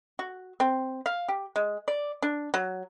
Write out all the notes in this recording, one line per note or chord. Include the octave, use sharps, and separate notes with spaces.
F#4
C4
F5
G4
G#3
D5
D4
F#3